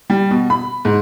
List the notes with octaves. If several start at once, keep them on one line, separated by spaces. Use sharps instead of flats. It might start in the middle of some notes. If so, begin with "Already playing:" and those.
G3
B2
B5
G#2